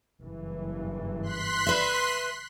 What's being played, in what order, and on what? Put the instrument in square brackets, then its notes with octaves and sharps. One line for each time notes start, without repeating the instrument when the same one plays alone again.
[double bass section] F#1 G2 E3
[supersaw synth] C6 F#6 B6
[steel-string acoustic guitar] B4 E5